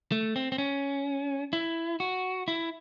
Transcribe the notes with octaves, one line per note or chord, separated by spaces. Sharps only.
A3
C4
C4
C#4
E4
F#4
E4